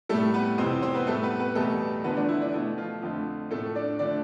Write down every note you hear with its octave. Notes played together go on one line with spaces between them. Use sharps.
A2 G3 A3 A4
B3 B4
F2 C3 E3 C4 C5
C4 C5
B3 B4
A2 G3 A3 A4
B3 B4
B3 B4
E2 B2 G3 A3 A4
E2 D3 F3 A3 B3 B4
D4
E4
D4
B2 A3 E4
F3 F4
F2 D3 F3 A3
A2 F3 A3 A4
D4 D5
D3 F3 A3 D4 D5